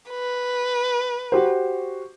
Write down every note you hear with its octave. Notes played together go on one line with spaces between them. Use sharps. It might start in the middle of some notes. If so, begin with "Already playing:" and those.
B4
F#4 G4 C5